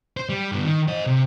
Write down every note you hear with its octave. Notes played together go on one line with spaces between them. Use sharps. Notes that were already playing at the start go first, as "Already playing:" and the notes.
C5
G3
G2 B3
D#3
C5 D#5
C3